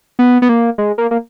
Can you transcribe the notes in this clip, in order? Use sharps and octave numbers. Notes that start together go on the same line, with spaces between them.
B3
B3
A#3
G#3
A#3
A#3